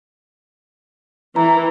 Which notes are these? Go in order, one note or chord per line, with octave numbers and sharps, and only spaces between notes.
E3 A#5